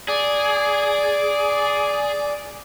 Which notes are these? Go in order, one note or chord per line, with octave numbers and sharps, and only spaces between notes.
G#4 D5